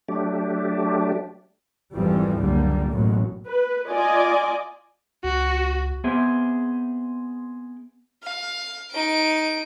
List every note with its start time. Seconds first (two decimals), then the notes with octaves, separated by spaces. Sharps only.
0.08 F#3 A3 D4 G4
1.95 G#1 F2 E3 F3 G3
2.38 F#1 C#2 D3 G3 A#3
2.90 A1 F#2 B2 F#3
3.47 B4
3.89 F4 D5 D#5 G#5
5.24 C#2 F#4
6.04 B3 C4 G#4 C5 E5
8.24 F5
8.91 D#4 D7